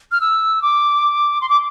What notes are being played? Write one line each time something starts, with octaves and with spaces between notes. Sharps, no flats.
F6
E6
D6
C6
D6